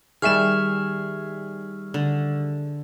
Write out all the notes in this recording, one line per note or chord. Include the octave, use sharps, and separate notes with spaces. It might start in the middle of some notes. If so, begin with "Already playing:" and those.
D#3 G3 G#4 E5 C#6 F6 E7
D3